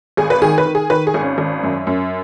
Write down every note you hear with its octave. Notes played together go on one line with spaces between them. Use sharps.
G#1 G#4
B4
D#3 G#4
B4
D#3
G#4
D#3 B4
G#4
G#1
C#4
G#1
F#2
F#2